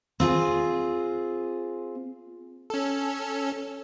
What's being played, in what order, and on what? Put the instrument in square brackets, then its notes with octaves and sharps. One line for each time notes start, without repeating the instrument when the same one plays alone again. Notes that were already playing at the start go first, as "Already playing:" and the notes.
[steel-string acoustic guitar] C4 F4 G#4
[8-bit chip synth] C#4 A4